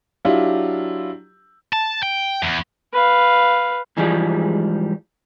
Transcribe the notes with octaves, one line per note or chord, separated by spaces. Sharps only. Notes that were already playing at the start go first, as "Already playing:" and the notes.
F#3 D4 E4 F4 G4
A5
G5
E2
B4 F5
G#2 E3 F3 G3 G#3